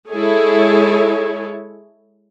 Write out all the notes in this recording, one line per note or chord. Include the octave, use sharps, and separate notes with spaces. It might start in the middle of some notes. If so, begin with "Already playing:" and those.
G#3 E4 G#4 A4 C#5